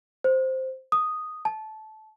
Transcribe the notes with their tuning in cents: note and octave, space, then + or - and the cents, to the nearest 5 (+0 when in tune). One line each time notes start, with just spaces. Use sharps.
C5 +0
D#6 -5
A5 -15